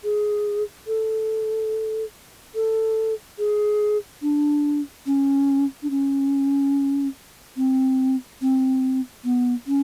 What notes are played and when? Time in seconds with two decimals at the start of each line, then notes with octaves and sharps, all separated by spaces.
0.04 G#4
0.87 A4
2.55 A4
3.39 G#4
4.22 D4
5.06 C#4
5.83 D4
5.90 C#4
7.57 C4
8.42 C4
9.25 B3
9.67 C#4